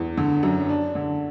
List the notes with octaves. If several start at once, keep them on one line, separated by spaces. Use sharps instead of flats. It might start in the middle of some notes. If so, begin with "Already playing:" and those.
Already playing: E2
D3
F#2
D4
D3